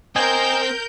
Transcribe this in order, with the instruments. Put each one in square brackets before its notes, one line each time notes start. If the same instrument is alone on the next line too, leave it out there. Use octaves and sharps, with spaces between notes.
[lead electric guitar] C4 [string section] A#4 G6 [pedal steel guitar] D#5 G5 G#5